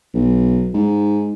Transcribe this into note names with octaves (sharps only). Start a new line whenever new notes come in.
B1
G#2